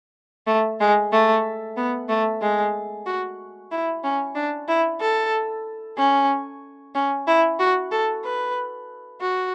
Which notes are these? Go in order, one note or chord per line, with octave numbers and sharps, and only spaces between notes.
A3
G#3
A3
B3
A3
G#3
F#4
E4
C#4
D4
E4
A4
C#4
C#4
E4
F#4
A4
B4
F#4